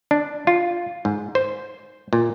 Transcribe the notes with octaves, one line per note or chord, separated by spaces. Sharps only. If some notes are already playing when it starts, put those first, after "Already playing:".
D4
F4
G#2
C5
A#2